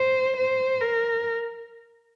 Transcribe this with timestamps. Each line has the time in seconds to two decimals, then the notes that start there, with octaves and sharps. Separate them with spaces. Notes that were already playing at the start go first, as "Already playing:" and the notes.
Already playing: C5
0.37 C5
0.81 A#4